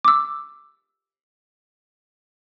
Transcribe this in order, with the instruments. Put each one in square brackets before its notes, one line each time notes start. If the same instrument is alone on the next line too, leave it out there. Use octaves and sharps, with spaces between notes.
[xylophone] D6 E6